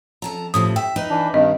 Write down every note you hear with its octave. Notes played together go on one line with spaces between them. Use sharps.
F2 A5 A#5
A2 C3 F3 D#6
E5 G5
D#4 B4
E3 D4
G2 D#3 C4 D#5